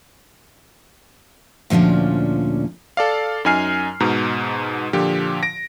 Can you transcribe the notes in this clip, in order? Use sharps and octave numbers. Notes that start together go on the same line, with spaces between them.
D2 A#2 F3 C#4 D4
A4 D5 F5
F#2 D#4 G#5 F6 C7
G#2 B2 A#5
A#2 D3 F3 G4
A#6 D7